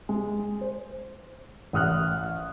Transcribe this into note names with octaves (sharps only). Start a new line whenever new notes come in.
G#3
C5
A1 F#5 D#6 F6 F#6